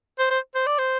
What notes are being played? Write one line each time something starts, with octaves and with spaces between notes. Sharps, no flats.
C5
C5
C5
D5
C5